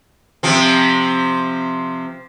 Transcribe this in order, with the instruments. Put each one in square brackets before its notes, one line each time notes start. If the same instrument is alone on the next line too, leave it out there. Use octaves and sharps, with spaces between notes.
[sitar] C3 F3 C4